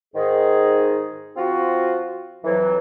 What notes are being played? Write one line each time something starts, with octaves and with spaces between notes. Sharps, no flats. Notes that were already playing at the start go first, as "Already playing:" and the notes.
G#2 D#3 G#4
F3 C4 F4 F#4
F2 E3 F#3